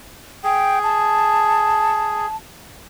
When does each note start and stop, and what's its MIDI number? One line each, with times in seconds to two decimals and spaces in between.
0.44 2.26 68
0.44 0.79 79
0.83 2.36 81